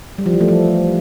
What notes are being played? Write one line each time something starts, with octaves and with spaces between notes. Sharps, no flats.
G3
F3
E3
A3
F3